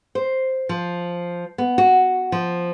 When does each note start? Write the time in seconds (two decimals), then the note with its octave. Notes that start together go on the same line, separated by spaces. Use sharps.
0.15 C5
0.69 F3
1.58 B3
1.78 F#4
2.32 F3